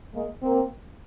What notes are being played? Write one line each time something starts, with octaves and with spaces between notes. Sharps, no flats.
G#3 A#3
A#3 C4